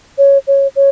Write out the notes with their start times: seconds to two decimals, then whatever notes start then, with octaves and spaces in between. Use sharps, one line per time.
0.18 C#5
0.47 C#5
0.76 C#5